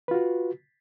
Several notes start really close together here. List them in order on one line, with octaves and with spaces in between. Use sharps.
B4 F4 F#4